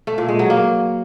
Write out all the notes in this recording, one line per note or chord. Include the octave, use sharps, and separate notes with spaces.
A3
A#2
G#3
F#3
A#3